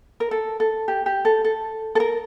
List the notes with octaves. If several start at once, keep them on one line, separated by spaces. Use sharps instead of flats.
A#4
A4
A4
G4
G4
A4
A4
A4
A#4